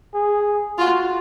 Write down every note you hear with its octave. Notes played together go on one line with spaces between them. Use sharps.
G#4
F4 F#4